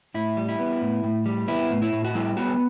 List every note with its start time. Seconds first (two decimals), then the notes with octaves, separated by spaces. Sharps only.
0.14 A2 E4
0.37 G3
0.49 E4
0.59 B3
0.82 A2
1.04 A2
1.26 G3
1.48 B3 E4
1.71 A2
1.82 E4
1.92 A2
2.05 F#4
2.15 G3 E4
2.37 B3 F#4